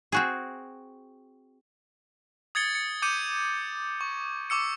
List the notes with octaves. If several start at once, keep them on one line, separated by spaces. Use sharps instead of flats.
C4 F#4 G#4
D#6 G#6 A6 C#7 G7
C#7
D6 G6 C#7 D#7
C#6
C#6 D6 E6 C#7